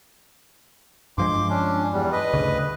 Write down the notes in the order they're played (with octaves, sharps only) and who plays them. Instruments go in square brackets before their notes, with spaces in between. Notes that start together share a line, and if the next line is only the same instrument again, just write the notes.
[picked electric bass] G2 F3 G#3 [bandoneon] C6 D6
[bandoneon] C#4 D4
E2 G3
B4 D#5
[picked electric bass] D2 C#3